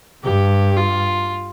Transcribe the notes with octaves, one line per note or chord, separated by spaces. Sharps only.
G2 G4
F4